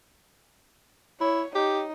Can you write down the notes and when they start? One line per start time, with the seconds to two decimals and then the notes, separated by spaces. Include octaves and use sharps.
1.21 E4 C#5
1.55 D#4 G4